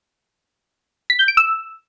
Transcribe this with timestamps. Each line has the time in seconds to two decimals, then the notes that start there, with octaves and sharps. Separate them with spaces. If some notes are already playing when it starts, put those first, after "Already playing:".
1.10 B6
1.19 G6
1.28 D7
1.37 E6